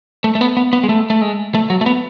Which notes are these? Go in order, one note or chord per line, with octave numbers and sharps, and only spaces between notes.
A3
A3
B3
B3
B3
G#3
A3
A3
G#3
A3
F#3
A3
B3